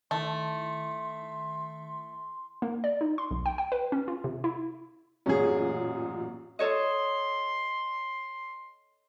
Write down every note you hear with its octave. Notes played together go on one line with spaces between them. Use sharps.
D#3 A3 E4 C6
A#3
D5
D#4
C6
B1
G5
G5
B4
C#4
F4
C3
E4
A1 F#2 A#2 C#4 G#4
A4 C#5 D#5 C6